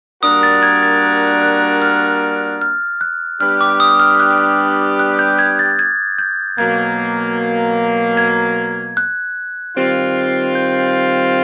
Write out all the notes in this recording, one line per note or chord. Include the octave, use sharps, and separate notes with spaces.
G3 A#3 D4 F#4 A#4 D#6
A6
G#6
A6
F#6
F6
F6
F#6
G3 B3 D4 G4 F6
D6
D#6
F6
F#6
F#6
G6
G#6
A6
G#6
G6
B2 F#3 A#3 G#6
G#6
F#6
D#3 G3 C4 F4
G6